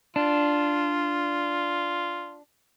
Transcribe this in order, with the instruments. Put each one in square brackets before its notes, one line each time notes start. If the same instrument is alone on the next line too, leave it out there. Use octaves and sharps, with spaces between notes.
[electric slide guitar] D4 [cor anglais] F4